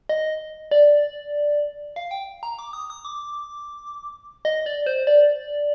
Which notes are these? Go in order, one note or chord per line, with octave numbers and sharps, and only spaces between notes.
D#5
D5
F5
G5
A#5
D6
D#6
D#6
D6
D#5
D5
C5
D5